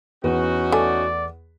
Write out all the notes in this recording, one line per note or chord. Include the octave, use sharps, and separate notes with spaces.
E2 C#4 D#4 F#4 B4
A3 D5 G#5